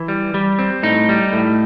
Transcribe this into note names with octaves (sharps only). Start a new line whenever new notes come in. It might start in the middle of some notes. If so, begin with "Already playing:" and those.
Already playing: E3
G3
G3
C4
A2 D#4
G3
A2